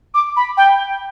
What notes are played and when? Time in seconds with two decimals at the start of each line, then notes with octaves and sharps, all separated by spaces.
0.14 D6
0.37 B5
0.57 G5